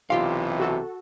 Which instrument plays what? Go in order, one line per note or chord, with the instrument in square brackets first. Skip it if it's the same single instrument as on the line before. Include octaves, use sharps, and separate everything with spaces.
[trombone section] B1 C3 E3 [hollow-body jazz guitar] F4 G4 F5 [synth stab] C6
[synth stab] F#4 A4